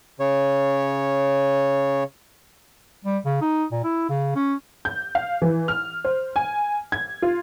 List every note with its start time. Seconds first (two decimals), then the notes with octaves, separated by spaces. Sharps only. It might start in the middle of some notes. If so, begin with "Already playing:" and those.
0.20 C#3 C#5
3.05 G3
3.26 C#3
3.42 D#4
3.72 A#2
3.84 E4
4.09 C#3
4.36 C#4
4.85 G6
5.15 F5
5.42 E3
5.68 F6
6.05 C5
6.36 G#5
6.92 G#6
7.22 F4